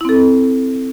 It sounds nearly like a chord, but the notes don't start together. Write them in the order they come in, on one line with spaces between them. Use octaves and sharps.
E4 C4 A4